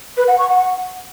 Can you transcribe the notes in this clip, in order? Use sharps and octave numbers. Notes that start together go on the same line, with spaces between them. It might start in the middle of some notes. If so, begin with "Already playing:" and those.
B4
F#5
C#6
F#5